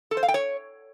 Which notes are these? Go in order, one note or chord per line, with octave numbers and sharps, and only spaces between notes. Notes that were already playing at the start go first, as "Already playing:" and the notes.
A4
C5
F5
G5
C#5